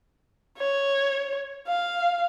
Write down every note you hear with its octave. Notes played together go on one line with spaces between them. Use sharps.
C#5
F5